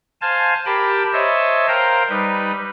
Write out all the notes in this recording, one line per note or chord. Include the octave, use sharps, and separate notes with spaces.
C5 F5 G#5 A5
G4 A#4 G5 A5 B5
C5 C#5 D#5 E5 A5
A#4 C5 F5 G5 A#5
G3 D#4 B4